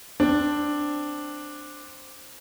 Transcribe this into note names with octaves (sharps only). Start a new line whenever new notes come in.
C4 D4